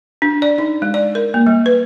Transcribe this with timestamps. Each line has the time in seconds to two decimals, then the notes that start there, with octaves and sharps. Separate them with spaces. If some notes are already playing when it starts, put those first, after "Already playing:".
0.22 D4
0.42 D5
0.58 D#4
0.82 G#3
0.94 D5
1.15 A#4
1.34 A#3
1.47 G3
1.66 B4